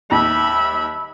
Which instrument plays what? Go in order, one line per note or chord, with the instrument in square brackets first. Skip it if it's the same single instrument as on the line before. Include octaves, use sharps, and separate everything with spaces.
[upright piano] D#2 [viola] E5 B5